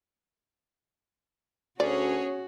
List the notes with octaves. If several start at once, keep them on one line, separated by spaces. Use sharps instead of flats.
D2 C#4 F#4 G#4 C#5 D5